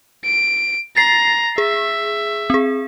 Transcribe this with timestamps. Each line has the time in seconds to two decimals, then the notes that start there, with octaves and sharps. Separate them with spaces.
0.25 D7
0.97 A#5 A6 C7
1.58 G#4 E5
2.50 C4 G#4